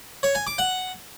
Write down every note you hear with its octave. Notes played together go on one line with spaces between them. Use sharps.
C#5
G#5
D6
F#5